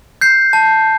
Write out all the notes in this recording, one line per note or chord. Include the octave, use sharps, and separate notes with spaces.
G6 C7
A5